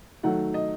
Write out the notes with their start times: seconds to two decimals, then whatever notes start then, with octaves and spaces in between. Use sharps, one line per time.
0.23 D#3 F#3 A3 F#5
0.54 D#5